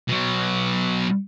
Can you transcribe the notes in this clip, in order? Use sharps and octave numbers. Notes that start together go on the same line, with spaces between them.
B2 F#3